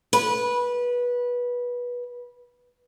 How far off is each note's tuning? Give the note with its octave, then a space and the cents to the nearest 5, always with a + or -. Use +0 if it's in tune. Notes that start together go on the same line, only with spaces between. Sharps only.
B4 -20